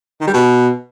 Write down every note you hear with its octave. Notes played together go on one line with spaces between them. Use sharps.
D#3
G3
B2